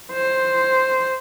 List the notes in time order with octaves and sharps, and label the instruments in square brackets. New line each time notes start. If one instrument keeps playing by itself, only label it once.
[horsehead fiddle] C5